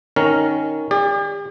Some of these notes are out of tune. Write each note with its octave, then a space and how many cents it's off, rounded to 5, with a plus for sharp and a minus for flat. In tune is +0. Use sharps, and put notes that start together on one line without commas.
D#3 +0 C#4 +0 A#4 +0
G4 +45 D5 -10